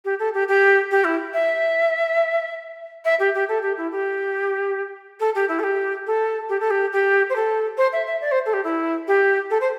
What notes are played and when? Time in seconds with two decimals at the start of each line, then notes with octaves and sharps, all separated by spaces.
0.05 G4
0.19 A4
0.34 G4
0.48 G4
0.91 G4
1.04 E4
1.33 E5
3.05 E5
3.20 G4
3.35 G4
3.49 A4
3.62 G4
3.77 E4
3.92 G4
5.20 A4
5.35 G4
5.49 E4
5.59 A4
5.63 G4
6.07 A4
6.49 G4
6.60 A4
6.71 G4
6.92 G4
7.30 C5
7.36 A4
7.78 C5
7.93 E5
8.06 E5
8.21 D5
8.32 C5
8.46 A4
8.53 G4
8.64 E4
9.08 G4
9.51 A4
9.61 C5